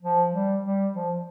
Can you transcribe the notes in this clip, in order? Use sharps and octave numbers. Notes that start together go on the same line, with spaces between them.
F3
G3
G3
F3